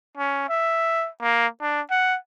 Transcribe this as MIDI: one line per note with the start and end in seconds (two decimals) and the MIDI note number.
0.18 0.48 61
0.49 1.09 76
1.21 1.47 58
1.62 1.81 62
1.91 2.17 78